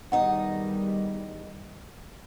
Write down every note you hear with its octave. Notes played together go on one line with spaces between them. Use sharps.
E2 D#3 G3 B3 D#4 D#5 F#5